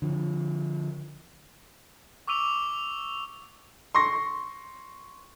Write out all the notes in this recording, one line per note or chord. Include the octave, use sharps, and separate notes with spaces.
D3 F3
C#6 D6 E6 D#7 F7
C6 C#6 A#6